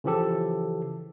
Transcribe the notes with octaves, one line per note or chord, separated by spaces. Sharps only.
C#3 E3 F3 G4 A4